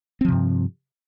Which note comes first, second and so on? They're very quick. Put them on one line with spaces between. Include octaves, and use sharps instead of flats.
C4 F3 C3 G2